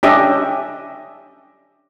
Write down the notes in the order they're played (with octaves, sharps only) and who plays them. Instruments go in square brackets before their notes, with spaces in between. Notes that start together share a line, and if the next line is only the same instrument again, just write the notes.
[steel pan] C#4 D4 G4 D#5 E5